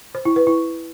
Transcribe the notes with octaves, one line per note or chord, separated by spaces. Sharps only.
C5
E4
B4
E4